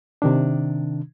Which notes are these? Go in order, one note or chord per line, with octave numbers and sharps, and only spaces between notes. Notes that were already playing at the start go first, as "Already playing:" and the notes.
C3 D#3 D4